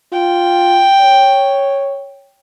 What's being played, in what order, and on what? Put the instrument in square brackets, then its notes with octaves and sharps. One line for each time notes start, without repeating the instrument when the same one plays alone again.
[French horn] F4 [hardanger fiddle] G5
[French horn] C#5